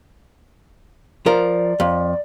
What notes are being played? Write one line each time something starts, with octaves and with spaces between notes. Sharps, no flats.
F3 A#4 D5
F2